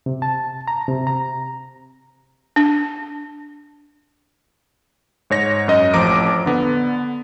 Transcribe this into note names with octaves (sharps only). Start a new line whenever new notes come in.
C3
A5
A#5
C3
A#5
D4
G#2 C#5 A#6
F#2 D#5
A1 F2 F3 A#5 D6 D7
D3 B3